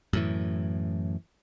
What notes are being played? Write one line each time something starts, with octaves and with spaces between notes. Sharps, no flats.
F#2 A2 E3